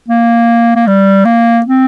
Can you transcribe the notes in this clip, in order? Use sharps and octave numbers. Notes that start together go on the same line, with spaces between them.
A#3
A#3
G3
A#3
C4